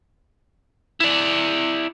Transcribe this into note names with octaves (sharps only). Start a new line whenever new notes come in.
E4 D5